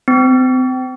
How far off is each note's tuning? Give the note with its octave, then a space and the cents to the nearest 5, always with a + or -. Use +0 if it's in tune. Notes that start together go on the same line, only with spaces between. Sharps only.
C4 -30